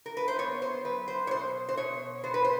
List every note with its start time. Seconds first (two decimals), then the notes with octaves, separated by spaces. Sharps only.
0.06 A#4
0.17 B4
0.28 C5
0.39 B3 C#5
0.62 C5
0.84 F#3 B4
1.08 C5
1.27 C#5
1.31 B2 C5
1.69 C5
1.77 B2 C#5
2.24 B3 C5
2.34 B4
2.44 C5